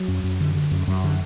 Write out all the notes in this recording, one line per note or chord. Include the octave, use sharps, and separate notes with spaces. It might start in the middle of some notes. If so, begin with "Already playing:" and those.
Already playing: F#3
F#2
F#2
D3
D3
F#2
F#2
D3